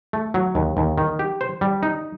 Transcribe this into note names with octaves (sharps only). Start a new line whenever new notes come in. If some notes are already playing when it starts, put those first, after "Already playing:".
A3
F#3
D#2
D#2
D#3
G4
C5
G3
D#4